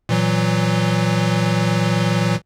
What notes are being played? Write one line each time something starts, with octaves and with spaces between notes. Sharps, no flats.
A#2 E3 F#3